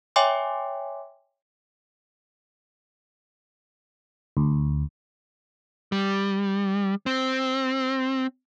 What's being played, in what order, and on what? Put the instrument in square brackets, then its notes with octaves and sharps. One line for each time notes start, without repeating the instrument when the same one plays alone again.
[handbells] C#5 E5 G5 G#5 C6 D6
[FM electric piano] D2
[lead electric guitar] G3
C4